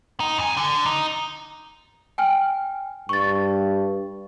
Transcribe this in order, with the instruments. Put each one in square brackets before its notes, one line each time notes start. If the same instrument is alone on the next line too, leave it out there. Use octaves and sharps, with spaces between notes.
[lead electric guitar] D#4
F2 G#5
D3
D#4
[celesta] G5 G#5 F6
[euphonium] G2 [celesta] C#6 A6